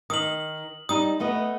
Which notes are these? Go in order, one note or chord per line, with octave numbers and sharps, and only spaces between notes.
D#3 D#6 F#7
G3 D#4 D#6
A3 B3 D#5